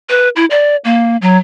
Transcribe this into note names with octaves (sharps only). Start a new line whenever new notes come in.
B4
E4
D5
A#3
F#3